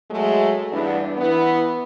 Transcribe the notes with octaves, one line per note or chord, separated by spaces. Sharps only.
F#3 G#3 A3
E2 G2 B3 D4
E3 B3